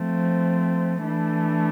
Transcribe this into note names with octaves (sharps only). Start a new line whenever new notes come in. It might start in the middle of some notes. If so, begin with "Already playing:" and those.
Already playing: F3 A3 C4
E3 A3 D4